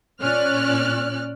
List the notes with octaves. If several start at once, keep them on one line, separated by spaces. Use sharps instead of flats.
A#2 C#4 D5 F6 F#6